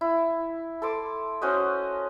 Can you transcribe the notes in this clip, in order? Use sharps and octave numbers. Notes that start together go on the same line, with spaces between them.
E4
A4 C6 D6
C#4 F#4 C5 D#5